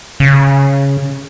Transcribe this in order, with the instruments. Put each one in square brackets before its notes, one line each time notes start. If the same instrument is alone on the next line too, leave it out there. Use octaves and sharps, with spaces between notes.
[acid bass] C#3